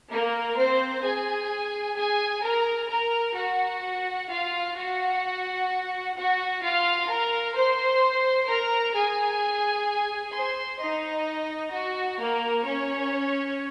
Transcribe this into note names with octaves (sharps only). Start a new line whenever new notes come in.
A#3 A#4
C4 C5
G#4 G#5
G#4 G#5
A#4 A#5
A#4 A#5
F#4 F#5
F4 F5
F#4 F#5
F#4 F#5
F4 F5
A#4 A#5
C5 C6
A#4 A#5
G#4 G#5
C5 C6
D#4 D#5
F#4
A#3 A#4
C#4 C#5